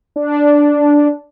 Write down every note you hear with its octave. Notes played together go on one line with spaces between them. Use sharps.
D4